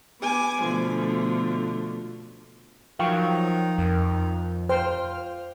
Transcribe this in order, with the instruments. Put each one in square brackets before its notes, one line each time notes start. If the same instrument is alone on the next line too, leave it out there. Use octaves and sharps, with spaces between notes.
[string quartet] B3 G#5 D6
B2 D3 F3 A3
[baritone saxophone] D#3 [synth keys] F3 [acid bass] F#3 [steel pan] F5 G5 C#6
[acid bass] F2 [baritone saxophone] D#3
[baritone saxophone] F4 [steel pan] C5 G5 [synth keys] F6